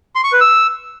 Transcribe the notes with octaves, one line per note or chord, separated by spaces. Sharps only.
C6
C#6
B4
E6